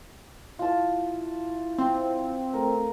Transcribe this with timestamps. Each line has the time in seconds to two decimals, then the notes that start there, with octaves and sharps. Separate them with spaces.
0.59 E4 F4 A5
1.78 C4
2.54 A3 A#4